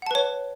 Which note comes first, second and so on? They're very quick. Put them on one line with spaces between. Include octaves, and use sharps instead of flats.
F#5 A5 B4 C#5